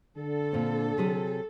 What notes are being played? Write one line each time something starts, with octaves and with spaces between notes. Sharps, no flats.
D3 A4
A#2 C4
C3 F#3 G#4